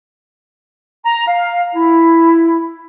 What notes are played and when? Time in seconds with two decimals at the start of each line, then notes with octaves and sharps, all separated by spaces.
1.05 A#5
1.28 F5
1.75 E4